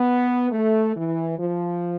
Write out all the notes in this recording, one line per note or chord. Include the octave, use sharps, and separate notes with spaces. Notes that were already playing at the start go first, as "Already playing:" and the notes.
Already playing: B3
A3
E3
F3